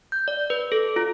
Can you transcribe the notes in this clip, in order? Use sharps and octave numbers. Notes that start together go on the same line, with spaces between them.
G6
D5
B4
A4
F4